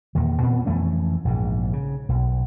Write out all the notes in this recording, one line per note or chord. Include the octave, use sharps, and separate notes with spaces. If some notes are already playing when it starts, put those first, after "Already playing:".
E2 A#2 D#3
A#2 B3 C4
F2 E3 A3 C#4
A#1 G#2
C#3
B1